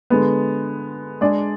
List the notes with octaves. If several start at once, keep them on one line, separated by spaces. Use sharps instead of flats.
D3 G#3 B3
G#3 D4 G#4 D5